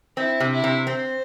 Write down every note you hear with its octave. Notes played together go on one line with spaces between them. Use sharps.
C4 E4
C3
E4
C3
C4 C5